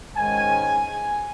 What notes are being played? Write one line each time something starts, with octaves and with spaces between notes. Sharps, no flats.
G#2 D#3 G#3 C#4 G#5